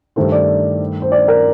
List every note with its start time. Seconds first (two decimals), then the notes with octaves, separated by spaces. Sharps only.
0.16 G2 D#3 A3 C5
0.32 D5
1.02 C5
1.12 D5
1.28 A#4